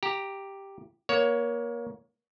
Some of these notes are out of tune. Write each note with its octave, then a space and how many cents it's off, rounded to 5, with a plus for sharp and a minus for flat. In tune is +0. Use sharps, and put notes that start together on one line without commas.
G4 +0 A#5 +0
A#3 +25 C#5 +15